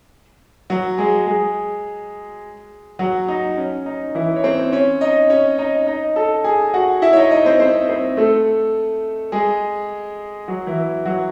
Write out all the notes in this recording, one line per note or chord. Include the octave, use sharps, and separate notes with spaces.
F#3 F#4
G#3 G#4
G#3 G#4
F#3 F#4
D#4
C#4
D#4
E3 E4
C#5
C4 C5
C#4 C#5
D#4 D#5
C#4 C#5
D#4 D#5
D#4 D#5
A4 A5
G#4 G#5
F#4 F#5
E4 E5
C#5
D#4 D#5
D#4 D#5
C4 C5
C4 C5
C4 C5
A3 A4
G#3 G#4
F#3 F#4
E3 E4
F#3 F#4